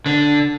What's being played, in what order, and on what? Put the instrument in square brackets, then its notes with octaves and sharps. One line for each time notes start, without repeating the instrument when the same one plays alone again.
[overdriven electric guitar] D3